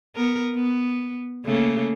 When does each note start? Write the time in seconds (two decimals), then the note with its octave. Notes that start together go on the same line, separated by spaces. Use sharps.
0.16 B3 A#4
0.55 B3
1.45 C#3 A3 A#3